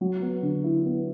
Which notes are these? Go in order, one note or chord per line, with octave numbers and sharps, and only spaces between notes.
F#3
B3
D3
E4
B3